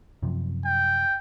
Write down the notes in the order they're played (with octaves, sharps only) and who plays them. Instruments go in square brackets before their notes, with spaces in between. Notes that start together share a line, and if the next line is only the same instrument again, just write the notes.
[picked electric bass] F#2 C3 F3
[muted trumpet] G5